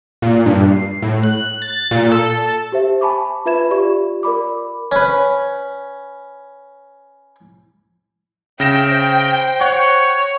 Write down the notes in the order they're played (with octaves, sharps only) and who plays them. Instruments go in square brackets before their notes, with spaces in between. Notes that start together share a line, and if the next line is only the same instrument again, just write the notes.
[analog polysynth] A#2
G2
C7
A2
F#6
A6
A#2
A4
[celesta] G4 C5 E5
G#5 A5 B5 C#6 D6
F4 B4 E5 B5 G#6 E7
F4 G4 D5 C#6
A#4 D5 B5 D6
[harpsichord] C#4 B4
[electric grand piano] C#3 A#6 E7 [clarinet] E5 [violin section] G5
[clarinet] C5
[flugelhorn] C#5 [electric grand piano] F#5 C#6